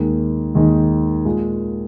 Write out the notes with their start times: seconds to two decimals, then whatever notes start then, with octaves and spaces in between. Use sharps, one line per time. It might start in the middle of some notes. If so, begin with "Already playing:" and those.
Already playing: D#2 D#3 G#3 D#4
0.55 D#2 D#3 G#3 D#4
1.25 A#2 G#3 F4